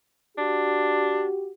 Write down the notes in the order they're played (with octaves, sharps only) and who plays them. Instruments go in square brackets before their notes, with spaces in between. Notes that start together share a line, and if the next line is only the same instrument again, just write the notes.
[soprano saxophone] D4 [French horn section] F#4 G4